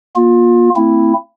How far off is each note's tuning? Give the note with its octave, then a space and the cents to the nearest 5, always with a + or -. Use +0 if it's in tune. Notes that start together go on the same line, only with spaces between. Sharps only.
A#3 +35 F4 +25
A3 +45 C4 +0 E4 +0